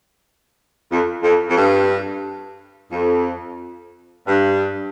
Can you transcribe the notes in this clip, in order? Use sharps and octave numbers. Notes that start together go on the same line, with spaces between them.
F2
F2
F2
G2
F2
G2